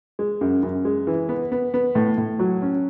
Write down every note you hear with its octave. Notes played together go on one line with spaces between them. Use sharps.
G#3
F#2
F#2
G#3
E3
B3
B3
B3
A2
A2
F#3
C#4